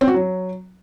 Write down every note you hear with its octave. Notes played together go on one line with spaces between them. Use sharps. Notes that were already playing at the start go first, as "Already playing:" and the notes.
C4
F#4
F#3